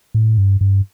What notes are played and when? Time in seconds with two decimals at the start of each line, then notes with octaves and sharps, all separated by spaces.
0.14 A2
0.38 G2
0.61 G2